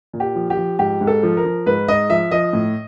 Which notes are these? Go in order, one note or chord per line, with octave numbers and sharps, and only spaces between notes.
A#2
G4
F3
G4
F3
G#2 G4
G#2
A4
F3
A#4
F3
G#2 B4
G#2 D#5
F3 E5
F3 D#5
A2